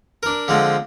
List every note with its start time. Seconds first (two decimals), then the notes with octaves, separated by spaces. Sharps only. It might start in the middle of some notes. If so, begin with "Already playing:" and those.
0.23 D4 A#4
0.48 D3 F3 G#3 C4